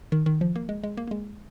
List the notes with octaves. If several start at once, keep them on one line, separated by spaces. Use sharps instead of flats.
D#3
D#3
F3
A#3
G#3
G#3
A#3
A#3
G#3